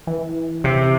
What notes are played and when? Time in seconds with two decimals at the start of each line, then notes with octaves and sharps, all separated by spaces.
0.07 E3
0.64 C3